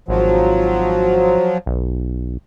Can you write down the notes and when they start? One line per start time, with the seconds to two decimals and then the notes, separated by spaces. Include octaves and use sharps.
0.08 G#1 F3 F#3
1.66 B1